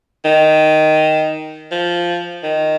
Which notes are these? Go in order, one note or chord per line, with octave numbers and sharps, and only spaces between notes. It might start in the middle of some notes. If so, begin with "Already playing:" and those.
D#3
F3
D#3